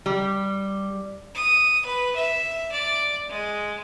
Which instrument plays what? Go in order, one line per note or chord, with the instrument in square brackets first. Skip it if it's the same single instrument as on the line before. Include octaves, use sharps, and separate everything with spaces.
[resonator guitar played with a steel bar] G3
[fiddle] D#6
B4
E5
D5
G#3